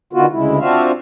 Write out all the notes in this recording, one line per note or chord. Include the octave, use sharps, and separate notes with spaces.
D3 D#3 B3 F4 F#4
D2 C#3 G#3 E4
C4 D4 F4 F#4 E5 F5